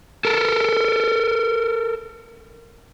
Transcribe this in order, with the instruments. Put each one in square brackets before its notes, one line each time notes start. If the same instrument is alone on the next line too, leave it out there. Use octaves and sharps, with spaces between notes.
[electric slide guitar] A4 A#4